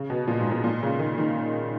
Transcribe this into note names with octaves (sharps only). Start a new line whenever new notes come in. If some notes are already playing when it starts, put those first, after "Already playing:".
Already playing: C#3
B2
A#2
G#2
A#2
A#2
C#3
D#3
D#3